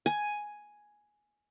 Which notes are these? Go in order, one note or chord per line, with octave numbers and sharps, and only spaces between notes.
G#5